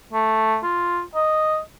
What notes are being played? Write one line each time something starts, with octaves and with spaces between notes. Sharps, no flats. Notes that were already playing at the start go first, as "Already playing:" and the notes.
A3
F4
D#5